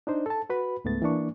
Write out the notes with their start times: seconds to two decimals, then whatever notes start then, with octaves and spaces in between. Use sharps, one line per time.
0.07 D4 D#4 C5
0.26 A4 A5
0.50 F#4 B4 B5
0.85 C#2 G#2 A3 B3 A6
1.02 E3 A#3 D4 C#6